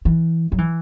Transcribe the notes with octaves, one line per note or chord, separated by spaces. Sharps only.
E3
F#3
E3